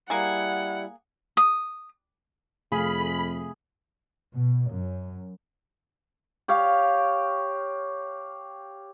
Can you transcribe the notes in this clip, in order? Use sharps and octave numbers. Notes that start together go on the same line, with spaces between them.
G3 A#3 E4 G#4 F#5
D#6
F2 C3 A3 G#4 F5 B5
B2
F#2
G4 C#5 F5